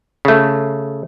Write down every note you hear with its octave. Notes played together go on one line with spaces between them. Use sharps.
C#3 A3